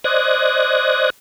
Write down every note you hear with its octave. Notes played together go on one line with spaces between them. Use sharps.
C5 D5 D#5 F#6 G#6 A#6